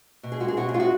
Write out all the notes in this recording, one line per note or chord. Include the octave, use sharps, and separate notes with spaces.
B2
G#4
G#3 F#4
G#4
B2 F#4
G#4
G#3 F4
F#4